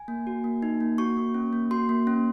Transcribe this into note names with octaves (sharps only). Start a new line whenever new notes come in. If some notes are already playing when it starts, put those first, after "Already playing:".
Already playing: G#5
A#3
F#4
A#3
D#4
A#3
F#4 C#6
A#3
C#4
A#3
F#4 C6
A#3
C#4